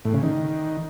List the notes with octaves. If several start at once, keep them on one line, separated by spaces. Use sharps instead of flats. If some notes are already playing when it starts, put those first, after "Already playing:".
A2
C#3
D#3